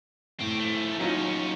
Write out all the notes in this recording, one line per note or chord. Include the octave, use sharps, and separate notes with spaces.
A2 C4 G4
F3 A3
D#2 F#3 C#4 D#4 F4